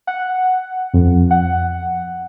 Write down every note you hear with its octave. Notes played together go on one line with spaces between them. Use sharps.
F#5
F2
F#5